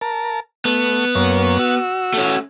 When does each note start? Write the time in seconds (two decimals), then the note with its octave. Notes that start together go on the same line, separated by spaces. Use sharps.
0.01 A#4 A5
0.65 A3 B3
1.15 F#2 A#3 C#5
1.59 F#4 E6
2.14 A3 C#4